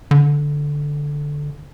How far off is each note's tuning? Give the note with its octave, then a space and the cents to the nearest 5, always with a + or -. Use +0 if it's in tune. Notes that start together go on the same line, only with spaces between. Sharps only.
D3 -5